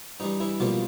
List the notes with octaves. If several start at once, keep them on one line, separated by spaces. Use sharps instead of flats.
G2 E3 G3 D#4
E3 E4
B1 B2 F3 G3 A#3 F4